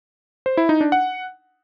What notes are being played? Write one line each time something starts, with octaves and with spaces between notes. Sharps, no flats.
C5
E4
D#4
D4
F#5